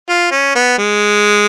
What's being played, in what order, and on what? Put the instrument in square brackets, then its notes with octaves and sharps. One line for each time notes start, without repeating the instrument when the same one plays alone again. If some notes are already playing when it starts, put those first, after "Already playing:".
[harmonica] F4
C#4
B3
G#3